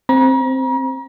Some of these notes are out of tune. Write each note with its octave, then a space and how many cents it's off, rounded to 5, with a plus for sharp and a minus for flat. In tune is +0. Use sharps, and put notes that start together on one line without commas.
C4 +0 A#5 +40